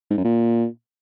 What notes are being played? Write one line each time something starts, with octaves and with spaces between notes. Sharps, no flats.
G#2
F#2
A#2